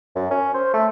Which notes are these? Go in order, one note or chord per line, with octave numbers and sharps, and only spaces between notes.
F#2
C#4
C5
A3